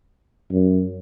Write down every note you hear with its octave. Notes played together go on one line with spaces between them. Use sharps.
F#2